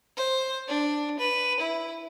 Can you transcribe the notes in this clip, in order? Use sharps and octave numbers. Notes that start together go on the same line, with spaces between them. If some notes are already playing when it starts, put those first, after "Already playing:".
C5
D4
B4
E4